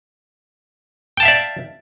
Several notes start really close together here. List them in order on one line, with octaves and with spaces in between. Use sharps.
G5 A5 F5 E5 D5